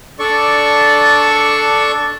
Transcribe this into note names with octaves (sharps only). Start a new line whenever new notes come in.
D4 A4 D5 C#6